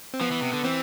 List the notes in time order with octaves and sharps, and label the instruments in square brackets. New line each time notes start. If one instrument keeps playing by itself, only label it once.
[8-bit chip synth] C4
[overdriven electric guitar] F3 [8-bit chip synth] B3
[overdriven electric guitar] E3
C3
D3
[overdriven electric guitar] E3 [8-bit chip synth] C4